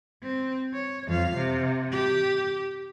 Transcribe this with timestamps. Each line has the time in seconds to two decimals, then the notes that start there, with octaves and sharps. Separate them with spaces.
0.23 C4
0.74 C#5
1.07 F2 F5
1.36 C3
1.92 G4